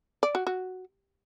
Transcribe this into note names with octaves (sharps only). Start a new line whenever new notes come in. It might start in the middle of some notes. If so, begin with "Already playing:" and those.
D5
F#4
F#4